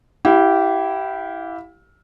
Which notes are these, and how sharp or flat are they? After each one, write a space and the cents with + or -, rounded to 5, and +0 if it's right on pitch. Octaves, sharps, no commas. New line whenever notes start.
E4 +0 G4 -20 F5 +25